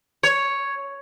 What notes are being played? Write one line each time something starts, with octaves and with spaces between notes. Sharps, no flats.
C#5